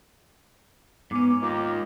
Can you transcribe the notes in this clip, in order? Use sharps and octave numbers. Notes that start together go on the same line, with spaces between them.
G#2 B3 C#4 D6
D#2 D#3 F4